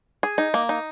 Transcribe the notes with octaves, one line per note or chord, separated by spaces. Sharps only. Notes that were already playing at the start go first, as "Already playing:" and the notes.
G#4
D#4
A#3
D#4